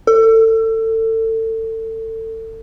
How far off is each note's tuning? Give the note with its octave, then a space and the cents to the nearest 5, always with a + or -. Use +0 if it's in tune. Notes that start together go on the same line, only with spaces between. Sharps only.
A4 +30